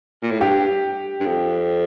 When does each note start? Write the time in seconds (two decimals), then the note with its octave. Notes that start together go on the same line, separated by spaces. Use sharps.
0.23 A#2
0.31 A2
0.40 G2 G4
1.20 G2
1.26 F2